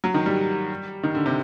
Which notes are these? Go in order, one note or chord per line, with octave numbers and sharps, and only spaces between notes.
F#3
D#3
G3
D#3
D3
C3